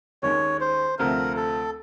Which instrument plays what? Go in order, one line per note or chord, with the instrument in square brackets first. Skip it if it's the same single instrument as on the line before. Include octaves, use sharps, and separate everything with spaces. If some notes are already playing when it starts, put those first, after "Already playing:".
[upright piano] D#2 D#3 G#3 C#4 [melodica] C#5
[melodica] C5
[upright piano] D2 C3 F3 A3 C4 [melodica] A#4
[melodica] A4